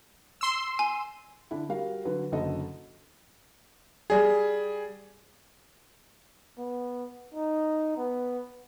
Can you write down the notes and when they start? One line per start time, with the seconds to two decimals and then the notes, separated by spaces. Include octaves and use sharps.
0.41 C6 E6
0.79 G#5
1.51 D3 D4 E4
1.69 G3 F#4 A#4 F5
2.05 D3 F#3 B4
2.32 F#1 D3 F#3 A4 D#5
4.10 G3 G#4
6.58 B3
7.34 D#4
7.97 B3